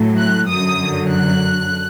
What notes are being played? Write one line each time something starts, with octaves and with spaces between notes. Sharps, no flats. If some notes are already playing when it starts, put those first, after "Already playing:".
Already playing: A2 F#3
F#6
F#2 D3 F#3 D#6
F#6